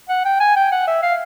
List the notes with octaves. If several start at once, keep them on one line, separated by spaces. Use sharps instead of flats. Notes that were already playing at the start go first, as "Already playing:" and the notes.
F#5
G5
G#5
G5
F#5
E5
F5